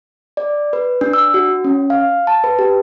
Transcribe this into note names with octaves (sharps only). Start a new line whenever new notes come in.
D5
B4
D4
E6
F#4
C#4
F5
A5
B4
G4